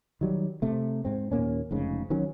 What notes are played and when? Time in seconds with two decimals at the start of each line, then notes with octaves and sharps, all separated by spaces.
0.21 D#3 F#3 G3
0.62 C3 A3
1.05 G#2 C4
1.32 D#2 A#2 A#3 C#4
1.71 F1 G#2 C#3
2.10 D#3 F#3 C#4